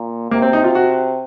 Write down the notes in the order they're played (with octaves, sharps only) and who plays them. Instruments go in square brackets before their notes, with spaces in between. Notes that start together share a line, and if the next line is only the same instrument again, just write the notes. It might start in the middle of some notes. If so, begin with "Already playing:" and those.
Already playing: [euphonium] A#2
[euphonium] C3 [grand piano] A#3
[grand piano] C4
D#4
F4
F#4